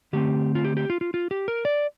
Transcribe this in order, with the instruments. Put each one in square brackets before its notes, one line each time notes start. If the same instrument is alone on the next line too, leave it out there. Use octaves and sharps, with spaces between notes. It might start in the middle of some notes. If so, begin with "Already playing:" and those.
[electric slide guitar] D3 A3 C4 G4
F4
G4
G4
F4
F4
F4
G4
A#4
D5